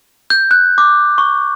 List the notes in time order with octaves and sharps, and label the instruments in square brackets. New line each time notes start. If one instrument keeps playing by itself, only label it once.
[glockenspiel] G6
F#6
D6
C#6